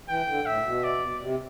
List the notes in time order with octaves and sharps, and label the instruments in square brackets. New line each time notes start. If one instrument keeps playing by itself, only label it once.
[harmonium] E3 [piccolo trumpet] G5
[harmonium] D3
[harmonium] A2 [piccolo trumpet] E5
[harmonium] B2
[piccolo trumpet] D5
[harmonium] C3